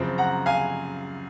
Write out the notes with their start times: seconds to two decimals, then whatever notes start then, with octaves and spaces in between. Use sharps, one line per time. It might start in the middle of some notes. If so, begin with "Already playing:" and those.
Already playing: F#2 C#3 F3 C4
0.18 F#5 A#5
0.46 F5 G#5